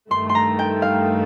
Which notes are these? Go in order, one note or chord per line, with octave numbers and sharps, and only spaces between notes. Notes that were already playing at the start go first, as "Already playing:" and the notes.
G2 D#3 A3 C6
C6
A#5
G5
F5